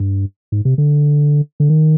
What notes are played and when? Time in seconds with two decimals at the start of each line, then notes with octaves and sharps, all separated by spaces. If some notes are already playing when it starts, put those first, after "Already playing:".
Already playing: G2
0.52 G#2
0.65 C3
0.78 D3
1.60 D3
1.69 D#3